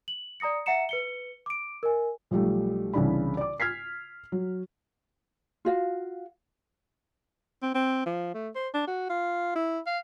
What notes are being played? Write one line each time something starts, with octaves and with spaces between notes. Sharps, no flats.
F#7
D5 A#5 D#6 A#6 C#7
E5 F#5 A#5 C#7 E7
B4 C#7 G7
D6 D7
A#4 D#5 G#5
B1 F3 G3 A3
C2 C#3 E3 D4 B5
D5 D6
F6 G#6 B6 C7
F#3
F4 F#4 F5
C4
C4
F3
A3
C5
D4
F#4
F4
E4
F5